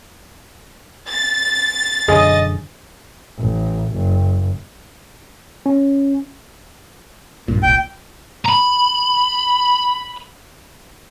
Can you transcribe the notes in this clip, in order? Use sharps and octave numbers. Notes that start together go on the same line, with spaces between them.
A6
E1 F#2 D3 G#4 D#5
A1
F#1
C#4
A#1 G2 A#2
E1 C2 A#2 G5
A#5 B5